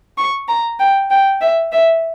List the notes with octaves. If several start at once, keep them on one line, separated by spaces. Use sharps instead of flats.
C#6
A#5
G5
G5
E5
E5